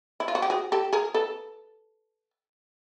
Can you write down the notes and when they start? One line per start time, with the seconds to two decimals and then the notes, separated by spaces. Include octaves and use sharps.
0.20 E4
0.28 F4
0.35 F#4
0.42 G4
0.50 F#4 G#4
0.72 G4 A4
0.93 G#4 A#4
1.14 A4 B4